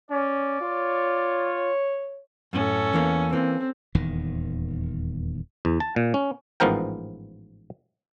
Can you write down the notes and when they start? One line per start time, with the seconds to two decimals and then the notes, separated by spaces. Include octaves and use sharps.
0.11 C#4 D5
0.61 F4 C#5
2.53 F#2 A2 C#4 A4
2.93 E2 E3 A#3
3.33 E3 A#3 C4
3.95 D#1 E2 D#3
5.65 E2
5.80 A5
5.96 A#2
6.14 C#4
6.60 A1 G#2 F3 B3 A#4 G5